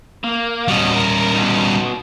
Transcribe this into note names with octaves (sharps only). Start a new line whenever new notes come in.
A#3
G3 C#4 F#4 D#5
A#4
B2 D#4